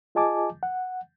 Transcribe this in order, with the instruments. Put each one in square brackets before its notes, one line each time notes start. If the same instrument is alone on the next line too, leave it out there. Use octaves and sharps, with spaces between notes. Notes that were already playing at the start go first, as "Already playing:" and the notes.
[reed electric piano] F4 G#4 D#5 G#5 A5 D6
F#5